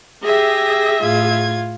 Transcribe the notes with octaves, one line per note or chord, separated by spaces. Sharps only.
G4 G#4 E5 A#6
A2 F4 G#6